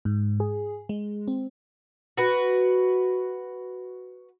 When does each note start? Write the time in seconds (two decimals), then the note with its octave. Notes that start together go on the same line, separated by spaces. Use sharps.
0.05 G#2
0.40 G#4
0.89 G#3
1.28 C4
2.17 F#4 B4